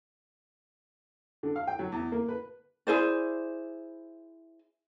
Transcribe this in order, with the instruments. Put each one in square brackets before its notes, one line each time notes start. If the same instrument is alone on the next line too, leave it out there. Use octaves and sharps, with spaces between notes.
[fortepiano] D3
F5
G5
F#3
E2
A#3
B4
[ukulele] E4 G#4 C5 D5